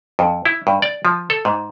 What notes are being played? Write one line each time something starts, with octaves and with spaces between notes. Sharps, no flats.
F2
E4
G2
D5
F3
A4
G#2